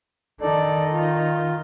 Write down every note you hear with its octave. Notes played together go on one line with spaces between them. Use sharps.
D#3 D#4 A4 D5
F4